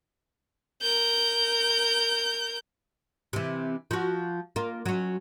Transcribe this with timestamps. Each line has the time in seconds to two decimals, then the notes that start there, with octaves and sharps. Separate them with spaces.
0.82 A#4 G6
3.33 C3 E3
3.91 F3 F#4
4.56 A#3 F4
4.86 F#3 C#4